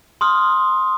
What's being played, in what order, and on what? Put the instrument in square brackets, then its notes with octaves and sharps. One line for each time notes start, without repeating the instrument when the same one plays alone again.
[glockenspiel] C6 D#6 F6